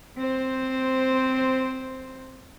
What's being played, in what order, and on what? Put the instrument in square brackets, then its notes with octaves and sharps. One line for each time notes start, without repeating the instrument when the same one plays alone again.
[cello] C4 C5